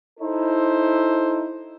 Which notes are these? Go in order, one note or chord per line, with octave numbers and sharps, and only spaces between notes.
D#4 E4 A4 C5